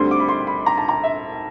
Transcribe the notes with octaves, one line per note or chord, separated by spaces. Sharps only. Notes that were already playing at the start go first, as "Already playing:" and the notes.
Already playing: D2 D3 G3 C4 C6
D6
B5
C6
B5
A#5
A5
A#5
E5